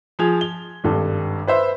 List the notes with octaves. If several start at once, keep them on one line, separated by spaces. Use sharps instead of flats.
F3 G#4 G#6 F7
G7
G#1 G2 A4
B4 C5 E5